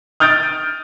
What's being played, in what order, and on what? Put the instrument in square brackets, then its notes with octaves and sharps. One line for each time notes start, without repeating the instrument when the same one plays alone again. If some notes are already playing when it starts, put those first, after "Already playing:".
[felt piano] D#6 F6 G6 A6 D7